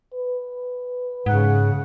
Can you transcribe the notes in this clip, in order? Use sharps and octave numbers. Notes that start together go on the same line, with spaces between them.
B4
G#2 C#3 F#5